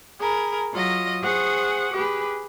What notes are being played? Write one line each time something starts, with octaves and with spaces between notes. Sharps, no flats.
G#4 A#4 B5
F#3 F4 D#5 A#6
G#4 C5 F#5 C#6 D#6
G4 G#4 B4